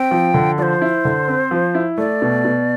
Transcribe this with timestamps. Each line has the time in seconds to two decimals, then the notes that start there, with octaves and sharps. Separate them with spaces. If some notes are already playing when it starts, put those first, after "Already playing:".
Already playing: C4 G5
0.11 F3
0.34 D3
0.58 F3 C5 D5
0.81 E4
1.05 D3
1.28 C4
1.51 F3
1.75 E4
1.98 A3 D5
2.22 B2
2.45 B2